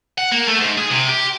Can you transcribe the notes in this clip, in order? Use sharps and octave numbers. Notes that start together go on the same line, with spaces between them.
F#5
A#3
A3
G#2
G#4
C3
G4